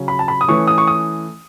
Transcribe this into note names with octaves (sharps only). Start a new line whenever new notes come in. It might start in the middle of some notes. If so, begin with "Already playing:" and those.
Already playing: C#3 F#3 C#4
B5
A5
B5
D#6
E3 A3 C#4 C#6
D#6
C#6
D#6